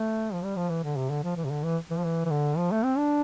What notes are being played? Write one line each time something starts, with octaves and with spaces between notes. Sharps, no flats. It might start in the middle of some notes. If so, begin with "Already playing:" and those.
Already playing: A3
F3
G3
F3
E3
D3
C3
D3
F3
E3
C3
D3
E3
E3
F3
E3
E3
D3
F3
A3
C4
D4